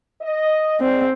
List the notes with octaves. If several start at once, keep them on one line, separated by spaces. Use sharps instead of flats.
D#5
G#2 C4 D5